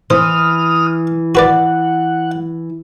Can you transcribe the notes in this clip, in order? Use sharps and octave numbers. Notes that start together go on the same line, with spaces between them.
E3 C5 D#6 F6
F#4 B4 D5 F#5